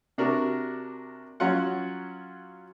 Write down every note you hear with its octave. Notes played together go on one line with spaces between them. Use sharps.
C3 D4 F#4 A#4
F#3 C#4 F4 F#5